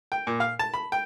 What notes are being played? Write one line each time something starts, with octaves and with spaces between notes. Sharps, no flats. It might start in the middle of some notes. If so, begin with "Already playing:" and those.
G5
A#2
F5
A5
B5
G5